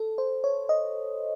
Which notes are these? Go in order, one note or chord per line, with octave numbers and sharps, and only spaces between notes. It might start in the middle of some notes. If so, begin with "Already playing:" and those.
Already playing: A4
C5
C#5
D#5